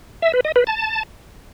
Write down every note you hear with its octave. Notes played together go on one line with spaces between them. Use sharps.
E5
B4
D#5
B4
A5